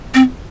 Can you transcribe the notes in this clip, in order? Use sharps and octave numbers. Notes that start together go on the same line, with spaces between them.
C4